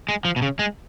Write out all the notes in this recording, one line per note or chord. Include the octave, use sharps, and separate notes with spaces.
G#3
F3
B2
C#3
G#3